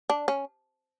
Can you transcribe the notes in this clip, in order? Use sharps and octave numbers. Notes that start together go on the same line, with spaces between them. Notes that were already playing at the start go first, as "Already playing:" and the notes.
D4
C#4